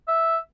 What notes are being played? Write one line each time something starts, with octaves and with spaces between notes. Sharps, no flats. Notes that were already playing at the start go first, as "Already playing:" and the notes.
E5